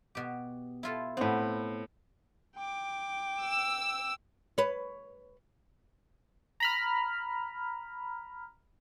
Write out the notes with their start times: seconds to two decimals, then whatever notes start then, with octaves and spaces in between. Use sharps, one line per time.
0.15 B2 G4
0.83 E4 F4 A4
1.17 A2 B3 C4 B4
2.56 G5 D6
3.42 E6
4.58 B4 C#5
6.60 A#5 B5 F6